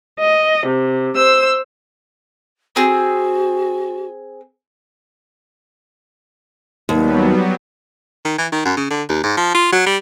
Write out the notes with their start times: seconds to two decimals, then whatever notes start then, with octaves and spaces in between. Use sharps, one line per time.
0.20 D#5
0.66 C3
1.16 C5 E6
2.76 C4 F#4 G#4
6.89 D#2 F#3 G3 B3
8.25 D#3
8.38 E3
8.52 D#3
8.65 F#2
8.77 C#3
8.90 D3
9.09 D#2
9.23 G#2
9.37 F3
9.55 F4
9.72 F#3
9.86 G3